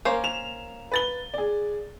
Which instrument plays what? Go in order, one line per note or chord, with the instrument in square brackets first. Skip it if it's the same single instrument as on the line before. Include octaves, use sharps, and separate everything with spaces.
[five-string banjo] A#3 C#4 C5
[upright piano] E7 F7
B4 A6 G7
G#4 D5